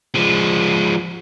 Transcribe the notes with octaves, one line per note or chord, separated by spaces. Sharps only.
F3 G#3